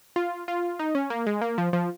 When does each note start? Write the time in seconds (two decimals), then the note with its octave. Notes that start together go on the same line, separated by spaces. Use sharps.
0.16 F4
0.48 F4
0.79 D#4
0.95 C#4
1.10 A#3
1.26 G#3
1.42 A#3
1.58 F3
1.73 F3